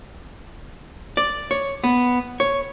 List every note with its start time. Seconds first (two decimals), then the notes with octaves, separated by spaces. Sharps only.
1.17 D5
1.51 C#5
1.84 B3
2.40 C#5